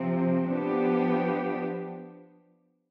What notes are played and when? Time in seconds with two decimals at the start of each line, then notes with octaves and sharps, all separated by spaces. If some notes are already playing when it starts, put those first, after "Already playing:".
Already playing: C3 F3 C4
0.50 F3 B3 D4 G4